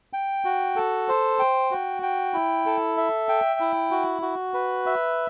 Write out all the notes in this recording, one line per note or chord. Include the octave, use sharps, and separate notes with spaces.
G5
F#4
A4
C5
G5
F#4
G5
E4
A4
E5
G5
E4
F#4
F#4
B4
E5